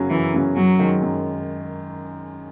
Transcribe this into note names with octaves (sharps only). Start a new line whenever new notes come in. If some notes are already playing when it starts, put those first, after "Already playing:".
Already playing: F#2 C#3 F#3 C#4
F#2 E3
C#3 F#3 C#4
F#2 F#3
D#3 G#3
F#2